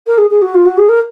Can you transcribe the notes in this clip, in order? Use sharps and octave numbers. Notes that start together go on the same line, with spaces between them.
A#4
G#4
G#4
F#4
F4
F#4
G#4
A#4